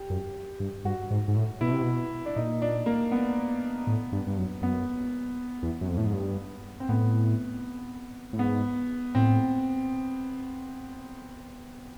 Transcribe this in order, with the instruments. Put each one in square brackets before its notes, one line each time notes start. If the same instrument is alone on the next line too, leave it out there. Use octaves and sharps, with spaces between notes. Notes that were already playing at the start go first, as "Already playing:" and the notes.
Already playing: [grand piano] G4
[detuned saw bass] F#2
G2
[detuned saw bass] G2 [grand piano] F#4
[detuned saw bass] G#2
G#2
A2
[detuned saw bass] B2 [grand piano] E4
[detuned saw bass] C3
B2
[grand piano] D4
[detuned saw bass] A#2 [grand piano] D#4
[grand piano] D4
A#3
B3
[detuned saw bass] A2
G2
G2
F#2
[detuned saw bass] F#2 [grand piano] B3
[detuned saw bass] E2
F#2
F2
A2
G#2
G2
[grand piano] C4
[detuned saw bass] A2 [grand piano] B3
[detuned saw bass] A2
[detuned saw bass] G#2 [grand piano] B3
[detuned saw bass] A2 [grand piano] C4